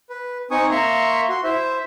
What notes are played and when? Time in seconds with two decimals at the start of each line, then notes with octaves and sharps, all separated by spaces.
0.10 B4
0.51 C4 D#4 G#5 C#6 D#6
0.71 A#3 E5 A#5 C6 C#6
1.29 F#4 C6
1.44 E4 C5 E5